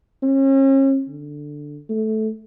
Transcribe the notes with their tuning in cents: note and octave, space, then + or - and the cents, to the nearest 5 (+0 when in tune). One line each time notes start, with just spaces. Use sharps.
C#4 -40
D3 +5
A3 -15